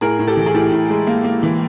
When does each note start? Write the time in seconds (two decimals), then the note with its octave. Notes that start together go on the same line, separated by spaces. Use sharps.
0.01 A2 G#4 A#4
0.19 A2
0.27 G4 A4
0.37 E3
0.46 G#4
0.54 A2 G4 A4
0.72 A2
0.90 G#3
1.07 A#3
1.25 A#3
1.43 E3